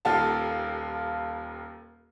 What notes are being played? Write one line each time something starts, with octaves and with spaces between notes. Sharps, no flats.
D#1 D#2 F4 A4 F5 A5